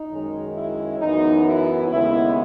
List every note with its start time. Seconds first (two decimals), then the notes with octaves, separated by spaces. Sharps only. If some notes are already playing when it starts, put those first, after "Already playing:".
Already playing: D#4
0.10 F#2 D#3 G#3 C#4
0.54 E4
0.99 F#2 E3 B3 D#4
1.43 E4
1.87 D#2 C#3 G#3 B3 E4